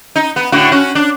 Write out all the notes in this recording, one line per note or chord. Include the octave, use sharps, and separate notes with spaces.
D#4
B3
A2 D3 F#4
C#4 F#4
D4